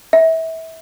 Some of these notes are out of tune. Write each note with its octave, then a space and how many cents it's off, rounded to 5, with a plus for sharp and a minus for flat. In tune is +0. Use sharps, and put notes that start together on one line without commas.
E5 -25